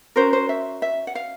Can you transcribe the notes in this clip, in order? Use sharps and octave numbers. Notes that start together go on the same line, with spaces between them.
C#4 F#4 A#4 C5
C5
E5
E5
F#5
F5